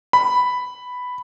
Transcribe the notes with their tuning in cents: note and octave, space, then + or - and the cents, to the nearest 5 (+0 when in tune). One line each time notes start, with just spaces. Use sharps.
B5 +5